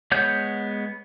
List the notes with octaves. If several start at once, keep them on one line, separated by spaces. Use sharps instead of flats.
G#3 B3 C#5 F#5 G6